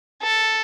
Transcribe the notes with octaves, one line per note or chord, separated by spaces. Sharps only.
A4